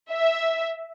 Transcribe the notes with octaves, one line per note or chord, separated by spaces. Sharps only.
E5